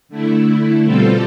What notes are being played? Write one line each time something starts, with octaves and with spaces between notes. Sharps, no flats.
D3 A3 E4
B2 G3 C4 F4 A4